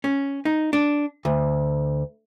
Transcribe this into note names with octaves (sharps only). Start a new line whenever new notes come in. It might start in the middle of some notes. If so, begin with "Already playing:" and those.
C#4
D#4
D4
D2